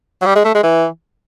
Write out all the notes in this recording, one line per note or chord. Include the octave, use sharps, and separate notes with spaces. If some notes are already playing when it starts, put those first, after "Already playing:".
F#3
G3
G#3
A3
G#3
E3